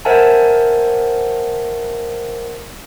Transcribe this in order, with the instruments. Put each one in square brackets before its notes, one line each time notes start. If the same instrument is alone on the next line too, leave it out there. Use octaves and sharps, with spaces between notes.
[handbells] A#4 C5 E5 F#5 G#5 A5